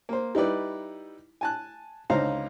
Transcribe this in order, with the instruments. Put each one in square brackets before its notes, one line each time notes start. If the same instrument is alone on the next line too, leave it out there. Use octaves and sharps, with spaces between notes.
[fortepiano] A#3 C5
G3 D#4 E4 B4 D5
G#5 A5 F#6
C#2 D3 D#4 C5 F5 A#5